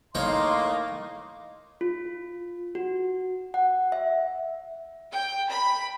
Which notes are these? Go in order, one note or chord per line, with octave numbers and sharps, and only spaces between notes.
A2 A#3 D#4 C#5 D#5 F5 A#5 C6
F4
F#4
F#5
E5
G5
B5